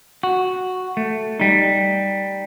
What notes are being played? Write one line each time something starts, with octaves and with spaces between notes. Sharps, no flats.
F#4
A3
G3 D#4